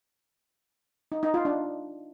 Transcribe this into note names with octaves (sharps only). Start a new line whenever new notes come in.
D#4
D#4
F4
D4